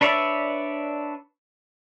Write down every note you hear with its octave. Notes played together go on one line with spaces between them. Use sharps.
D4 B4 C#5 D5 E5